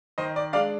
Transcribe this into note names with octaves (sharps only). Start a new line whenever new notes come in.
D#3 C5 D#5
D5
G#3 D4 D5 F5